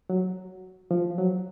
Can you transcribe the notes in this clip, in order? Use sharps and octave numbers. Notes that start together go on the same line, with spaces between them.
F#3
F3
F#3